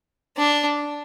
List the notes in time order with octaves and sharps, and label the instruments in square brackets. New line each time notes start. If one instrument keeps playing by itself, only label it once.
[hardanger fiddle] D4